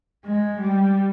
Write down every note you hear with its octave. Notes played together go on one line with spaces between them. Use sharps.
G#3
G3